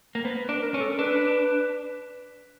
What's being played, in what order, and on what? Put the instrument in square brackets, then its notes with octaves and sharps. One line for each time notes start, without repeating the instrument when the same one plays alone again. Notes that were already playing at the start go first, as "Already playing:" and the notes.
[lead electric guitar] A#3
[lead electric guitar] B3 [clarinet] C5
[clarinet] B4
[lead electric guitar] D4
[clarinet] A#4
[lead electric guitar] C#4
[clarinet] A4
[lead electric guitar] D4 [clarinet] B4